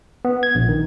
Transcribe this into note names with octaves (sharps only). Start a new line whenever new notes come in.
B3
G#6
A#1
D#3